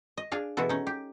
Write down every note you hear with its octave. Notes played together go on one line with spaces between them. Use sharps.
D#5
D4 G#4 F5
B2 E3 G#3 F#4 A4
C#4 D#4
G4